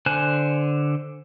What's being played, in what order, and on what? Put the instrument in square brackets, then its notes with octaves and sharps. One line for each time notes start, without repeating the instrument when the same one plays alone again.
[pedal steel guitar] D3 C5 G#5 F#6